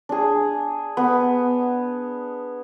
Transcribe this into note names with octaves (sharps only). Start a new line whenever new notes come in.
D4 G#4
B3